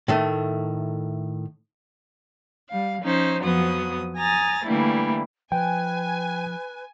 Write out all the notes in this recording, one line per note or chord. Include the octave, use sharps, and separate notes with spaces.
A2 D#3 A3
G3 F5
F3 C#4 D#4 C5
F2 F3 F#3 B3 D#6
G#5 A#5 D#6 A6 A#6
D3 E3 G3 A3 A#3 E4
F3 B4 G5 G#5